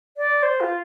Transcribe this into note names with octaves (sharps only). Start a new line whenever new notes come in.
D5
C5
F4